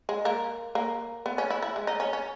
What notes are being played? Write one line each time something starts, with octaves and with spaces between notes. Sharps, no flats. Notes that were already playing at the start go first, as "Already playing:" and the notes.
G#3
A#3
A#3
B3
C#4
E4
E4
G#3
D#4
C#4
C#4